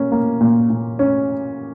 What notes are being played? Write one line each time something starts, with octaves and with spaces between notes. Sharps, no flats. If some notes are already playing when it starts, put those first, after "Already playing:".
Already playing: A#3 C#4
A#3
A#2
A#2
C#4